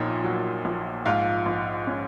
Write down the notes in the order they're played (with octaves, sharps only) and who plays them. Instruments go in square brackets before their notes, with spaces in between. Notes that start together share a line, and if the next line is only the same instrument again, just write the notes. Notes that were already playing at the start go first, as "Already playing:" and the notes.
Already playing: [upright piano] A#1 A#2 [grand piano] D#4 C#5 D#5
[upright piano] F#3
A#1
[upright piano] G#2 [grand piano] F4 F5
[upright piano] A#1
C#4